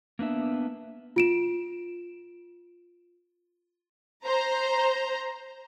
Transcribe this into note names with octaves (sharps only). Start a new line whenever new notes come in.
A#3 B3 D4 E5
F4 D7 E7
C5 A#5